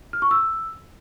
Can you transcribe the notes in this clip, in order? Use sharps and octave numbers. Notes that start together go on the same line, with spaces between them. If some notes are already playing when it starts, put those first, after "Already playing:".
F6
C#6
E6